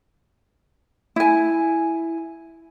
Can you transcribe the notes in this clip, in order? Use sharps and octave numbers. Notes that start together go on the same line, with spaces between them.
E4 G#5